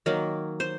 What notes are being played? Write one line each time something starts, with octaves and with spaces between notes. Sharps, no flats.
D#3 F#3 A#3 A#4
C5